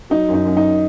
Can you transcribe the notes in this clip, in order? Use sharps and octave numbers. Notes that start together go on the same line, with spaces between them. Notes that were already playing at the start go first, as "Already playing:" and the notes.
F#3 D#4
F#2
D#4
F#2
D#4